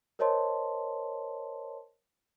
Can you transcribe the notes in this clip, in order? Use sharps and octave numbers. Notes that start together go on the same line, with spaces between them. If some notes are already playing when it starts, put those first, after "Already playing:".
A#4 C5 C#5 D#5 A5 C6